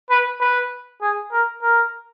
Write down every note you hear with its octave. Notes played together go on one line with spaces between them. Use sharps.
B4
B4
G#4
A#4
A#4